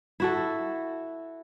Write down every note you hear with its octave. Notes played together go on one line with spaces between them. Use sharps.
E4 F#4 A4